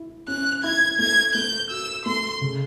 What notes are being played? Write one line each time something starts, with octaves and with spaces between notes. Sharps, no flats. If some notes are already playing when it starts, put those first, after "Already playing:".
Already playing: E4
C#4 F#6
E4 G#6
A3 G#6
A3 G6
F#4 E6
A3 C6
C#3